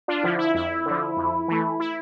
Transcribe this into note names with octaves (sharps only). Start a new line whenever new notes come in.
D4 F4
D3 F3 E4
E4
F2 E4
D3 F3
F2
E3 A3
E4